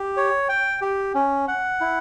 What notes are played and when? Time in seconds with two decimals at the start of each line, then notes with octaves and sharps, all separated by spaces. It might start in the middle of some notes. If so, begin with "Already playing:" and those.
Already playing: G4
0.17 C#5
0.49 G5
0.82 G4
1.15 C#4
1.48 F#5
1.81 E4